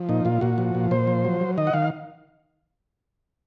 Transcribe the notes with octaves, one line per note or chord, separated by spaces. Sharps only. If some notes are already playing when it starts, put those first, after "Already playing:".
Already playing: F3
A#2 D#4
A#2 F4
A#2 F#4
F3
A#2
A#2 C5
F3
F#3
F#3
D#3 D#5
F#5
D#3 F5